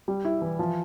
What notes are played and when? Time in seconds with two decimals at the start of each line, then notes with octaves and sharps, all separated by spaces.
0.08 G3
0.25 E4
0.42 E3
0.59 F3